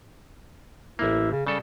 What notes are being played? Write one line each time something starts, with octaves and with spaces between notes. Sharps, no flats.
A1 A#3 E4
C#3
C#3 G3 A4